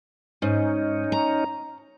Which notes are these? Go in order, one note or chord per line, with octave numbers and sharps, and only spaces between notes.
G#2 C#4 D#4
A#5